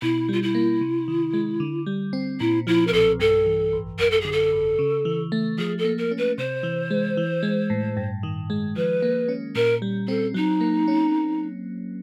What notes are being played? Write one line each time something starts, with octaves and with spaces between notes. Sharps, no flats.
B2 E4
G3 F4
E4
A#3
C3
D#3
G#3
D3
G3
C4
A#2 E4
F3 E4
A#4
B1 A4
G2 A4
E3
A1
F#2 A#4
A4
D3 G#4
A4
G#1
C#3
E3
A3
F3 G#4
A4
A#3
A#4
C#4
B4
C3 C5
E3
G#3
E3
G#3
A2
G2
D#3
G#3
F3 B4
A#3
C#4
A#2 A#4
G3
C4 A4
F#3 D#4
A#3
C#4